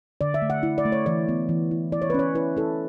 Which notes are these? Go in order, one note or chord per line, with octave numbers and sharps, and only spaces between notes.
D3 D5
E5
A3
F#5
E4
D5
A3
C#5
E3 D5
B3
E3
E4
E4 D5
C#5
B4
C#4 C#5
E4 B4
E4 A4